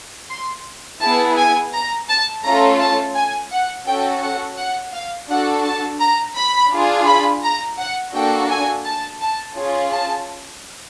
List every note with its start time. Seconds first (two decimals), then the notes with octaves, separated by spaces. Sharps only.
0.30 C6
1.01 B3 E4 G#4 A5
1.37 G#5
1.73 A#5
2.09 A5
2.44 A3 C#4 F4 A4 A#5
2.80 A5
3.15 G#5
3.51 F#5
3.87 C#4 F#4 A4 G5
4.22 F#5
4.57 F#5
4.93 F5
5.29 D4 F#4 A4 F#5
5.64 A5
6.00 A#5
6.35 B5
6.71 D4 F4 G#4
7.06 B5
7.43 A#5
7.79 F#5
8.14 A#3 D4 F#4 A4 G5
8.49 G#5
8.85 A5
9.21 A5
9.56 C#4 F4 G#4
9.92 A5